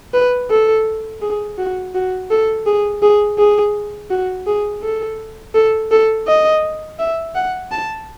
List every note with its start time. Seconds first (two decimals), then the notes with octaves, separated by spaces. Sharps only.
0.14 B4
0.50 A4
1.22 G#4
1.58 F#4
1.95 F#4
2.31 A4
2.66 G#4
3.02 G#4
3.38 G#4
4.10 F#4
4.47 G#4
4.83 A4
5.55 A4
5.91 A4
6.27 D#5
6.99 E5
7.35 F#5
7.72 A5